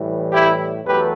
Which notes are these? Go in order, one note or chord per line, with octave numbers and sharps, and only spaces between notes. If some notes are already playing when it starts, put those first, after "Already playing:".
Already playing: A2 E3 G3
E4 G4
E2 F#3 A3 G4 B4